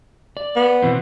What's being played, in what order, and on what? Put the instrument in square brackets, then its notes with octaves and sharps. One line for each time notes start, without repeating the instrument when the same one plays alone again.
[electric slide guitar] D5
[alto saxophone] B3
[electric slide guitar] B2 E3 C4